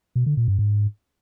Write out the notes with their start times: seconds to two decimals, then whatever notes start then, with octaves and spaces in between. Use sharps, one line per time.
0.15 B2
0.26 D3
0.37 A#2
0.48 G2
0.59 G#2